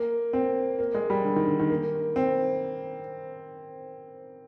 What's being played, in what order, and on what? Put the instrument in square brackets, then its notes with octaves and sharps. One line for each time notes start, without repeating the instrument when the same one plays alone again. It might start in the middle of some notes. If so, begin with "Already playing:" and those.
Already playing: [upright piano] A#3
C4
A#3
G#3
G3
D3
D#3
D3
D#3
A#3
C4